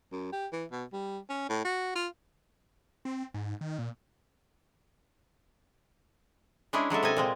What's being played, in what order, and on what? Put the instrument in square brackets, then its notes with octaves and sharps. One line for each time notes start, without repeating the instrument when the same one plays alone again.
[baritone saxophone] F#2
G4
E3
B2
G3
C#4
A2
F#4
F4
[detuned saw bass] C4
G#2
D#3
A#2
[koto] G#3 C#4 D4 E4 G#4
F#3 G#3 A4 E5
C3 A4 D#5 G#5
A#2 G#3 C4